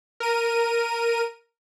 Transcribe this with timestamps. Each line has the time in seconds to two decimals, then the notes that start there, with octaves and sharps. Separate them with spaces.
0.20 A#4 D#7